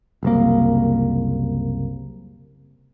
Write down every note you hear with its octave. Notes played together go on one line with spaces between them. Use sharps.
F#1 C2 A#3